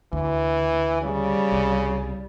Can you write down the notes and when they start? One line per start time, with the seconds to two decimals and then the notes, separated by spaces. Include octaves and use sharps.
0.13 D2 E3
1.02 C#3 G3
1.52 C2